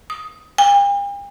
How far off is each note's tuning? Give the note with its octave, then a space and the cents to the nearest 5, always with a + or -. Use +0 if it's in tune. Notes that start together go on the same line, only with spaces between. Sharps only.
D#6 +5
G5 +45